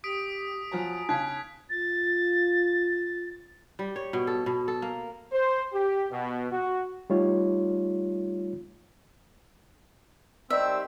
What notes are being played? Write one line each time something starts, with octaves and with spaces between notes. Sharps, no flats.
G4 D#6 B6 D7
F3 F#3 G#5 A#5
C#3 D#4 F5 F#6 G#6 B6
F4 A6
G3
C#5
B2
A4
B2
A4
A#3
C5
G4
B2
F#4
G3 A3 D#4 F4 C#5
D#3 G3 C4 E5